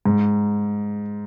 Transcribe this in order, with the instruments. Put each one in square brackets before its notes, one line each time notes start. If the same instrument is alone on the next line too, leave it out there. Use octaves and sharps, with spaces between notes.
[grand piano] G#2